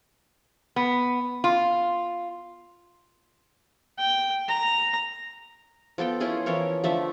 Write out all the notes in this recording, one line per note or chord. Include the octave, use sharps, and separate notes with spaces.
B3
F4
G5
A#5
F3 B3 A4 G5
C#4 E4 F4 G#4
E3 F3 A#4 C#5
D3 F3 A3 E5